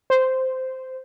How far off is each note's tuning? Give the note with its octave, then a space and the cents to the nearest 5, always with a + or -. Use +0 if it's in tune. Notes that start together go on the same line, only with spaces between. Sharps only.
C5 -10